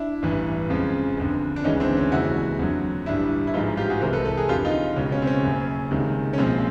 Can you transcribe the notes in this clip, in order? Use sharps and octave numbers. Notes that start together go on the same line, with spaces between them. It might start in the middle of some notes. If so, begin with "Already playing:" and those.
Already playing: D4 E4
A1 G2 E3
F2 C#3 F3 G#3
G1 F2 D3
D4
D2 C#3 E3 G#3 C#4 D#4
C4 D4
C#4
F#1 F2 C3 E3 G#3 E4 F#4
F2 D3 F#3
A1 G2 D3 G3 D4 E4
E4
A1 G#2 F3 G#3 D#4 F4
F4 G4
F#4 G#4
C2 C3 E3 G#3 A#4 C5
A4 B4
A4 B4
G#4 A#4
F2 D3 F3 F4 G4
D#4 F4
C#2 B2 G#3 C#4
C#4
C4
C#4
F#1 F#2 C#3
C#2 C3 D#3 G#3
C#4
B1 A#2 F3 G#3 C4